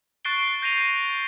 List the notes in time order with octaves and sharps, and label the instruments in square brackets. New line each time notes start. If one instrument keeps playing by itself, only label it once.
[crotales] C#6 F#6 A6 C7 D7 G7
G6 A#6 D#7 F7